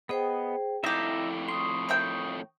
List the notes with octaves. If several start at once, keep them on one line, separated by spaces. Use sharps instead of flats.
B3 G#4 C5 D#5 G5
F2 A2 D#4 E4 G4 E5 A#5
C6 C#6 D#6
A#4 E5 G5